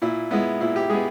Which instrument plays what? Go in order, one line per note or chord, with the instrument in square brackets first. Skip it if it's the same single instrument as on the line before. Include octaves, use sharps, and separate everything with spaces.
[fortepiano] A#2 E4
G#3 B3 E4
A#2 E4
G4
G#3 B3 G#4